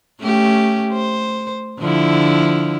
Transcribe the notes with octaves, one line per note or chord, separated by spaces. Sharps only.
A3 C#4 G4
C5
D3 F3 E4